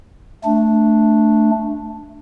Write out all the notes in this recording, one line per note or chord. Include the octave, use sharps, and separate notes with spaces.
A3 D4